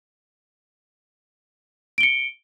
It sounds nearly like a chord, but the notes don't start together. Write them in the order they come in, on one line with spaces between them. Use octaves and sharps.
D7 G7 C#7